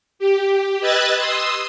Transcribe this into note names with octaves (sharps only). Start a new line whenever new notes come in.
G4
B4 D#5 E6 F#6 G#6 A6
C6 D#6 E6